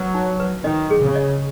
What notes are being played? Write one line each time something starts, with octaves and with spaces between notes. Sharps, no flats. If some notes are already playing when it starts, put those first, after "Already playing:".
Already playing: F#3 B4
D#4
B4
D#3 D#5
G#4
C#3
D#5